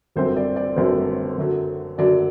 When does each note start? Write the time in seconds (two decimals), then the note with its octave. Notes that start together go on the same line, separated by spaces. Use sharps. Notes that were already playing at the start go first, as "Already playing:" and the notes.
0.16 G1 F#2 D3 F#3 C4 C5
0.37 D5
0.56 D5
0.76 G1 F#2 D3 F#3 C4 C5
1.38 F#2 D3 F#3
1.98 F#2 D3 F#3 D5